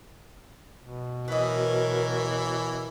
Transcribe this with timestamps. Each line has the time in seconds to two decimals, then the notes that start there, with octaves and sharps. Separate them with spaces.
0.80 B2
1.28 E3 F#3 A#4 B4 D#5